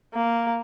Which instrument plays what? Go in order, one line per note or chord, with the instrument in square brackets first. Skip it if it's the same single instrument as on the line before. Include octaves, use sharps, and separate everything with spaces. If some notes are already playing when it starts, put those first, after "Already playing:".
[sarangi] A#3